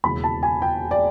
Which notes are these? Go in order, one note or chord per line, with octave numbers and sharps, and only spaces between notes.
E1 D#2 C#3 E3 B5
A5
G#5
G5
D5